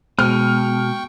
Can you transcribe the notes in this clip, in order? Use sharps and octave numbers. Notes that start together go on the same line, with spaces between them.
B2 G#3 G5 C#6 F6